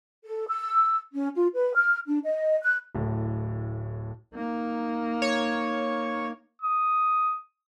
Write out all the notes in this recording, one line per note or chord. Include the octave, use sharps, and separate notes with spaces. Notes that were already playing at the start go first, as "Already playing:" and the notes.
A4
E6
C#4
F4
B4
F6
D4
D#5
F#6
D1 A2
A#3 D#4
C#5
D#6